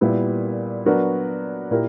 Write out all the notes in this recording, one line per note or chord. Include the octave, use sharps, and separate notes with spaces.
A#2 G3 B3 E4
F#3 B3 D4 F#4 A#4
A#2 A#3 E4 G4 A#4